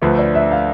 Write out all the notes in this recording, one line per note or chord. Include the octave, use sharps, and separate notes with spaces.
D2 D3 F3 A3 B4
D5
E5
F5